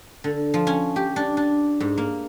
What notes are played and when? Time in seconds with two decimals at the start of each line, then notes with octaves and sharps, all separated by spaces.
0.24 D3
0.54 F3
0.67 C#4
0.96 G4
1.16 D4
1.37 D4
1.80 G#2
1.98 A#3